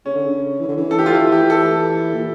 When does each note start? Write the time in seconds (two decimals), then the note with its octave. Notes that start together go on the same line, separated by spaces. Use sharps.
0.05 C#3 C#4
0.15 D3
0.26 C#3
0.60 E3
0.68 D3
0.77 E3
0.91 A4
0.99 G4
1.06 F4
1.14 E3 E4
1.32 G4
1.50 A4
2.14 A#2